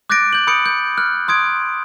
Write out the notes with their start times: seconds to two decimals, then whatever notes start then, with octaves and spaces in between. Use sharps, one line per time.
0.10 D6 F#6 G6 A6 A#6 D7
0.33 G6 F#7
0.47 B5 D#6 G6 C#7 D7
0.66 G6
0.98 F6 F#6
1.28 C6 D#6 G#6 D7